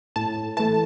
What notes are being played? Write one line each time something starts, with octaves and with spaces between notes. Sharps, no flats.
A2 A5
E3 A3 A5